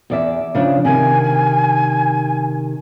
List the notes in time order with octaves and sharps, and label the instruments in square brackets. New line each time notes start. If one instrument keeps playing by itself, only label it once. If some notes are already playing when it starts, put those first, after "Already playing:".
[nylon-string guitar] E2 D5 E5
C#3 F3 D4
[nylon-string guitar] C3 D#3 [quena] G#5